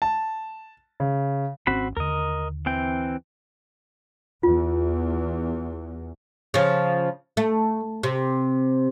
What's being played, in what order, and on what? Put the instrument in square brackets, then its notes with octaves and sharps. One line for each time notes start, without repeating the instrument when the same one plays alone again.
[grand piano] A5
C#3
[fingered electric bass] G#1 C3 C#4 [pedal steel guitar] C4 F#4 B5
[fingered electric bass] D#2 D3 [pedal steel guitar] A#4 D#5
[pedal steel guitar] E3 C4 G5
[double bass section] E2 [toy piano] F4
[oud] C#3 F3
A3
C3